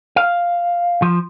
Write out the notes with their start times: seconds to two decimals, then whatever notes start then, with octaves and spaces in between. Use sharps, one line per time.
0.16 F5
1.02 F3